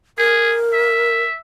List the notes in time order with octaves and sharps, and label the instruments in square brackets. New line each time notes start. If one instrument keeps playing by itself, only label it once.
[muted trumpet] G#4 [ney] A#4
[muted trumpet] E5